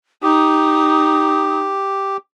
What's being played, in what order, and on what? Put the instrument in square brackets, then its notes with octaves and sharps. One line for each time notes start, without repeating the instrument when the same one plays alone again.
[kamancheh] D#4 [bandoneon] G4 [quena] D#6